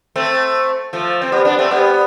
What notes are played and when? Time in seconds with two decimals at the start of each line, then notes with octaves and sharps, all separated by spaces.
0.16 A3 C4
0.93 F3 A3
1.22 C4
1.32 G3 B3
1.45 B3 D4
1.58 A3 C4
1.71 G3 B3